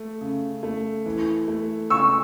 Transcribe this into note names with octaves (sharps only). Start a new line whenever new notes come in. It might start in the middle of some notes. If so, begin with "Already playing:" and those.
Already playing: A3
C#3
A3
E3
A3
C#2 C#6 E6